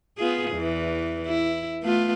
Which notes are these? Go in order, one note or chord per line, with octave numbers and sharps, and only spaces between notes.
B3 F4 G#4
E2 E3
E4
A3 B3 F4